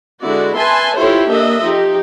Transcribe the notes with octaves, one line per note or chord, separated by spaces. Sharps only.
D3 G#3 E4 F#4 D5
B4 E5 G#5 A5 C6
E4 F4 G4 A4 C5 C#5
A#3 D4 D#5 E5
F3 D#4 G4